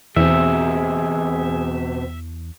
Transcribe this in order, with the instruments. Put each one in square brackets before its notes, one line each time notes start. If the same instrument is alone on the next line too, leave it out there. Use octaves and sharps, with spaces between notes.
[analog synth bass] E2 [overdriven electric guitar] B2 C4 [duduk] G#4 [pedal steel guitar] E5